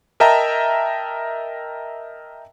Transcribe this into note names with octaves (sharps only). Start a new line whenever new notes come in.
A#4 D#5 E5 G5 A5 A#5